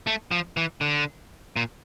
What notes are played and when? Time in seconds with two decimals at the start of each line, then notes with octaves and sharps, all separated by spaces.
0.07 A3
0.31 F3
0.57 E3
0.81 D3
1.56 A#2